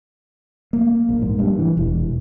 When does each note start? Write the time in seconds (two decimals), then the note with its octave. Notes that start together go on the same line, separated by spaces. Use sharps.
0.73 A#3
1.09 A#1
1.22 G#2
1.39 G2
1.59 E3
1.77 E1